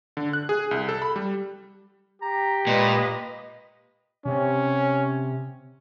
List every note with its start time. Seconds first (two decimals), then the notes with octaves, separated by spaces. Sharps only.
0.17 D3
0.33 F#6
0.49 G#4
0.71 C2
0.89 A4
1.02 B5
1.16 G3
2.22 G4 A#5
2.67 A#2 G#3 B4 D#5
4.26 C3 C#4